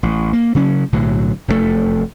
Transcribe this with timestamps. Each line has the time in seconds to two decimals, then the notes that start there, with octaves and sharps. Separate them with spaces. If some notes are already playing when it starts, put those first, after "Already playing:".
0.03 A1
0.33 A#3
0.55 C#3 F#3 C#4
0.93 B1 A2 D3 F#3
1.48 F1 F#2 B2 A3